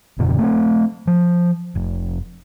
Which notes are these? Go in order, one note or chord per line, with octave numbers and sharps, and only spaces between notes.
E1 F2 A#2 C#3
A3 C4
F3
F1